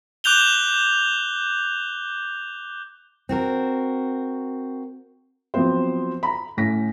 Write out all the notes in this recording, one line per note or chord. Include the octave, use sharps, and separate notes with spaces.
D6 F#6 G6 F7 G7
C4 F#4 A#4
F3 F#3 B3 C4 C5
A#5 B5
A2 C#4 A#6 B6